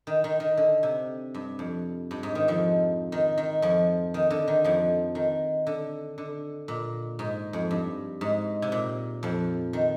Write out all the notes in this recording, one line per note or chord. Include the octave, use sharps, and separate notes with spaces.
D#3
D#3
D#3
D3
C3
G2
F2
G2
G#2
D#3
F2 F3
D#3
D#3
F2 F3
D#3
D3
D#3
F2 F3
D#3
D3
D3
A#2
G#2
F2
G2
G#2
C3
A#2
F2 F3
D#3